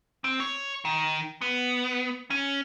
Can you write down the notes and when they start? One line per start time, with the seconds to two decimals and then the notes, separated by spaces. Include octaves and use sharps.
0.24 C4
0.40 C#5
0.85 D#3
1.41 B3
2.30 C#4